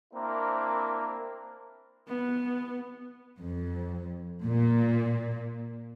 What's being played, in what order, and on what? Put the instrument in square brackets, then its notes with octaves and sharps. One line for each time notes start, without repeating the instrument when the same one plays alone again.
[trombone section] A#3 C4 D4 E4 A#4
[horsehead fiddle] B3
[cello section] F2
A#2